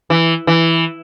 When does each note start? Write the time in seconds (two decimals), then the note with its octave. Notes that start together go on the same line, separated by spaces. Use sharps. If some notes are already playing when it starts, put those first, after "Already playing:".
0.10 E3
0.47 E3